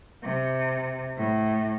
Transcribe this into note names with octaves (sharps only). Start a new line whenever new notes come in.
C3
A2